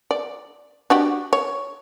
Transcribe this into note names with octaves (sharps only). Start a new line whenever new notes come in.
D5
D4 F#4 G4
C#5